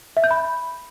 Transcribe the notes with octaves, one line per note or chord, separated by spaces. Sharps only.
E5
G6
B5